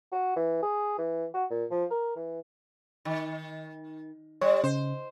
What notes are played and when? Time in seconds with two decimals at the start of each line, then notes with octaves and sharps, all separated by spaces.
0.12 F#4
0.36 E3
0.62 G#4
0.98 E3
1.34 F#4
1.50 A#2
1.71 F3
1.91 A#4
2.16 E3
3.05 D#3
4.41 G3 C#5
4.64 C#3 C5